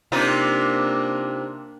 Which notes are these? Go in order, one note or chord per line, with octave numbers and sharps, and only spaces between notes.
C3 A#3 D4 D#4 F4